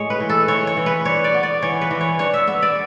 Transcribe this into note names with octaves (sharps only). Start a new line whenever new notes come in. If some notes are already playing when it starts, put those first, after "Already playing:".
Already playing: A2 G#3 C#5
B4
E3
A4
E3 C#5
C#5
E3
B4
D4 C#5
D5
B3
D5
E3 C#5
B4
E3
C#5
D4 C#5
E5
B3 E5
D5